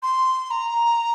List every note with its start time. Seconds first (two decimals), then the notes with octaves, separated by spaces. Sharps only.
0.03 C6
0.51 A#5